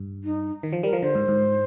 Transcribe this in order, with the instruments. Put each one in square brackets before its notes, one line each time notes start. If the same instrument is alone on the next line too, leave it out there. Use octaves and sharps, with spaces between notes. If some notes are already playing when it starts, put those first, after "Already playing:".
Already playing: [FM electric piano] G2
[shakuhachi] D#4
[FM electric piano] D#3
F3
[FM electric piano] G3 [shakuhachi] A#4
[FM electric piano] F3
[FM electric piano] D3 [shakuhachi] C5
[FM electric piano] G#2
G#2